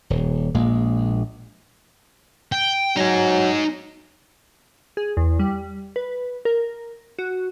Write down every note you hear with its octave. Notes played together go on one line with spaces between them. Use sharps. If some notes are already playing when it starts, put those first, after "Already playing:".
D#1
A#1 A#2 G#3
G5
F#3 D#4 G#5
G#4
E2
G3
B4
A#4
F#4